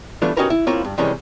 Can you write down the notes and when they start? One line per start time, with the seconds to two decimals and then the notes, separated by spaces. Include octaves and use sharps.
0.22 E3 G3 A3 B3 D4 F4
0.37 C#4 D#4 F#4 G4 A#4 B4
0.50 E4
0.67 A#3 C4 E4 F4 A#4 C#5
0.85 G2
0.98 C3 D#3 E3 G3 G#3 C#4